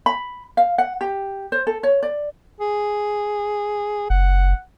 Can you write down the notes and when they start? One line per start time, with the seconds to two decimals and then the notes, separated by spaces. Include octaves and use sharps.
0.06 B5
0.57 F5
0.78 F#5
1.01 G4
1.52 C5
1.67 A4
1.83 C#5
2.03 D5
2.61 G#4
4.10 F#1 F#5